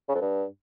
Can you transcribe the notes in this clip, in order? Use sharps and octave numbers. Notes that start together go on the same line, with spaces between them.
C#3
F2
G2